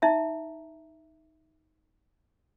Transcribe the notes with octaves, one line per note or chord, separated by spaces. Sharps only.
D#4 E5 A#5